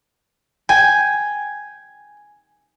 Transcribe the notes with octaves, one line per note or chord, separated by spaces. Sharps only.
G5 G#5